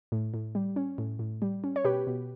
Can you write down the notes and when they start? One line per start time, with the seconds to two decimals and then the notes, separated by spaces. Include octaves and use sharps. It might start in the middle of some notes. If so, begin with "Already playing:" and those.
0.12 A2
0.34 A2
0.55 G3
0.76 C#4
0.98 A2
1.19 A2
1.42 G3
1.64 C#4
1.76 C#5
1.85 B2 G4 B4
2.07 B2